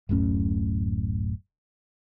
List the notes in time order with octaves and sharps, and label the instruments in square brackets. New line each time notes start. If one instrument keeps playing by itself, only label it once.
[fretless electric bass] D1 F#2 A2 C#4